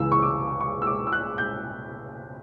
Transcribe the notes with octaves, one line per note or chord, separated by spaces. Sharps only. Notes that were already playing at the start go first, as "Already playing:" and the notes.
Already playing: C#2 C#3 E3 E6
C#6
D6
C#6
E6
D6
E6
F#6
G6